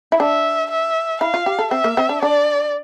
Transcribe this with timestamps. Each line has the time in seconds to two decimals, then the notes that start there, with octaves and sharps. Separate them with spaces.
0.12 E4
0.20 D4 E5
0.71 E5
1.21 E4 F5
1.34 F4
1.46 G4
1.59 A4
1.71 C4 E5
1.84 A#3
1.97 C4
2.09 D4
2.22 D4 D5